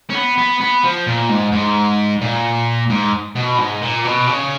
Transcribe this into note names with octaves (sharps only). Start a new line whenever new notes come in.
C#4
B3
B3
B3
F3
A#2
G#2
G#2
A#2
G#2
B2
G#2
A#2
B2
C#3